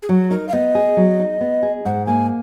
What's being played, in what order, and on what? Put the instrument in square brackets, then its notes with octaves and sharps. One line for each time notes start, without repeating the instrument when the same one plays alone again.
[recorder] G#4
[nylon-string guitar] F#3 [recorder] F#4
[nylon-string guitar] D#4 [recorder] A#4
[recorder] F5
[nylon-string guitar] B3 [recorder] D#5
[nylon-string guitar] G#4
F#3
D#4
B3
G#4
[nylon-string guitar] G#2 [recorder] F#5
[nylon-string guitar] A#3 [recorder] G#5